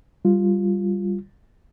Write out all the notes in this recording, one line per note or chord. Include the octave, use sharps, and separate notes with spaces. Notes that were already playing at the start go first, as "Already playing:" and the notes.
G3 F4